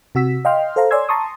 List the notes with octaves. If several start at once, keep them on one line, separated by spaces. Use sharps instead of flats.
C3 F#4 E6 B6
D#5 F5 G5 C6 F6
A4 C5 F5 A#5
C#5 D5 G#5 C6 E6 G#6
A5 A#5 C6 C#6 D#6